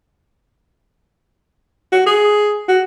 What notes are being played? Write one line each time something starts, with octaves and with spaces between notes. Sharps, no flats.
F#4
G#4
F#4